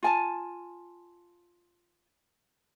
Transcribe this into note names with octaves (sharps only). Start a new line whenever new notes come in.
F4 G#5 A5